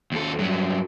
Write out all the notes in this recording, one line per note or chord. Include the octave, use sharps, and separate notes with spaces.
D#2 A4
G2 F#3